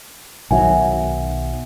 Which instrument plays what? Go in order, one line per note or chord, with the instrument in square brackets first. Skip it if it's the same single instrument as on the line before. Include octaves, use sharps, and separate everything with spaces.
[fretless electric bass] B1 D#3 F#3 [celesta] E5 F#5 G#5